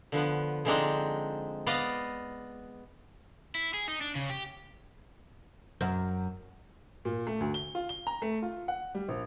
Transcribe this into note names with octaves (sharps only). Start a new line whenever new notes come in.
D3 F3 B3
D3 F3 G#3 C4 D4 D#4
B3 D5 D#5 F5
E4
G#4
D#4
D4
C#3
G4
F#2
A#2
A3
D2
G7
F4
G7
A#5
A3
F4
F#5
G3
A#1